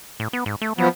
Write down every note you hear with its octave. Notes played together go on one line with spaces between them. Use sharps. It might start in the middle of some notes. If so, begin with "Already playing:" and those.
A2
B3
G#2
A3
F3 F#3 B3